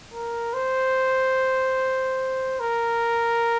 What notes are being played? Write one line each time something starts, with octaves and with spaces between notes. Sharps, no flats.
A#4
C5
A#4